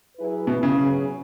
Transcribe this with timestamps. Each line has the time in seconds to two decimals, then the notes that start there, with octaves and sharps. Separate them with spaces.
0.18 F#3 E4 G#4 B4
0.47 B2 E3 B3 E4 B4
0.63 C#3
0.77 F#3 B3 G#4 C#5